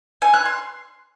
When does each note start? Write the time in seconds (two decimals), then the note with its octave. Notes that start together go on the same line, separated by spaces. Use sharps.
0.22 G#5
0.34 F#6
0.45 C6